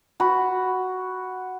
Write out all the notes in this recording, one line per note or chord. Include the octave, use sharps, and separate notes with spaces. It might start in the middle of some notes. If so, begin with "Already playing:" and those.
F#4 B5